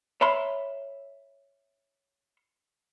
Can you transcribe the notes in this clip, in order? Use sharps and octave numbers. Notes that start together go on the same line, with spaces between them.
C#5 E5 B5 C6